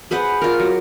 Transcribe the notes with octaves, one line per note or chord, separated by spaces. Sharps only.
G#4 B4 C5 F#5
F4 A#4
F#3